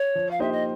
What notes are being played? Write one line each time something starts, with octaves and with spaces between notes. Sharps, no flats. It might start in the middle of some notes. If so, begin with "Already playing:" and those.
Already playing: C#5
F3
F5
A#3 D#4 G4 C5 E5
D#5